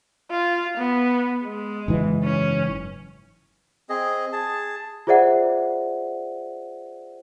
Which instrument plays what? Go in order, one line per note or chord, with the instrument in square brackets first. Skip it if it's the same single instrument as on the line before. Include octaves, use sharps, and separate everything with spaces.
[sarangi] F4
B3
G#3
[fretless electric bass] F#1 G#2 E3
[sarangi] C#4
[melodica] C4 G#4 D#5
G#4 A5
[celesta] F4 G#4 C5 D5 E5 F#5